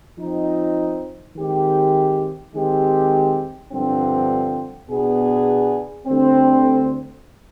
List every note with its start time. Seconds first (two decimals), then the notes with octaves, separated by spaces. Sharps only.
0.19 F3 C4 D#4
1.36 D#3 G#3 C4 G4
2.55 D#3 G#3 C4 G4
3.71 G2 D3 F3 C4
4.88 B2 B3 D4 G#4
6.06 D2 D3 G3 C4